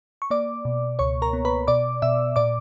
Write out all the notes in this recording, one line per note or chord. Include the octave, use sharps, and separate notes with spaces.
C#6
A#3 D5 D6
B2
C#2 C#5 C#6
A#4 A#5
B3
B4 B5
B2 D5 D6
B2 E5 E6
A#2 D5 D6